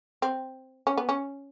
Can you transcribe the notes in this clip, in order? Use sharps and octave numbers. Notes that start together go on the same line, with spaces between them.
C4
C#4
B3
C#4